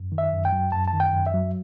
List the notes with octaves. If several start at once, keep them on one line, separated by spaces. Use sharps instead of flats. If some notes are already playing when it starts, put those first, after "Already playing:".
Already playing: F#2
D#3
E5
F#2
G5
F#3
F#2 A5
A5
D#3
G5
F#2
E5
F#3